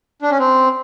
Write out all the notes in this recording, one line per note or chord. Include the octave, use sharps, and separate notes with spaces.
D4
C#4
C4